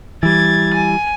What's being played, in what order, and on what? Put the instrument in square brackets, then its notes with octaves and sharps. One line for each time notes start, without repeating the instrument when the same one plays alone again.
[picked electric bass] E3 G3 [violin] G#6 A6
[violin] G#5